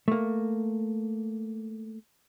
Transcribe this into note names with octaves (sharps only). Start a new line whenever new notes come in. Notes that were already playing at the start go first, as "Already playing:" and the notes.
A3 A#3